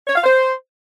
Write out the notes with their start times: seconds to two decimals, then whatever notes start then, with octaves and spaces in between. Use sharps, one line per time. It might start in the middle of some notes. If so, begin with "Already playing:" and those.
0.07 C#5
0.16 F5
0.24 C5